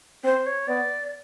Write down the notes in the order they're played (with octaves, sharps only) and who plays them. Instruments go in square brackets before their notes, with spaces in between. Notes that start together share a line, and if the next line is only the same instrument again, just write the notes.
[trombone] C4 [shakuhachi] C5
[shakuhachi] C#5
[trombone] B3 [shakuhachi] D5